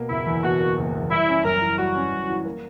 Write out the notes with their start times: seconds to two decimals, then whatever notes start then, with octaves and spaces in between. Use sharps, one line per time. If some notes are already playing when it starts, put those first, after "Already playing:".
Already playing: B2 A#3
0.10 F#1 E4
0.27 E2
0.43 B2 F#4
0.60 A#3
0.77 F#1
0.94 E2
1.10 G3 E4
1.28 C#4
1.45 F#2 A#4
1.61 E3
1.78 G3 F#4
1.95 C#4
2.11 F#2
2.28 E3
2.45 A#3